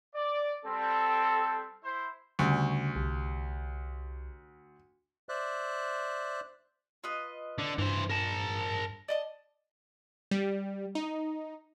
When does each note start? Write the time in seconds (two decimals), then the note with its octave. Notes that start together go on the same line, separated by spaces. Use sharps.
0.15 D5
0.65 G3 C4 A4
1.83 E4 C5
2.39 D2 C#3 G3 C#6
2.96 C2
5.29 C5 D5 E5 F#6
7.04 F4 B4 D#5
7.58 D3
7.78 G2 E3 C5
8.10 A#4 A5
9.08 D5 D#5 A5
10.31 G3
10.95 D#4